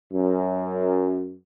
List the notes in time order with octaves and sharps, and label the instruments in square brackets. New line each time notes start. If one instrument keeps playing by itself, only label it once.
[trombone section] F#2